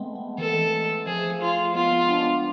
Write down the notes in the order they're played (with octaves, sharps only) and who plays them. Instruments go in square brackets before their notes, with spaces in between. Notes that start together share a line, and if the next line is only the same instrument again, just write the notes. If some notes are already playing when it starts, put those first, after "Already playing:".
Already playing: [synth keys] G#3 A3 B3 C4
G#3 B3
[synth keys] E3 G#3 [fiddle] A4
[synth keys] F3 A3 [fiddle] G#4
[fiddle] F4
[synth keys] G#3 B3 [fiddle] F4
[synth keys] G#3 B3
B3 D4
B3 D4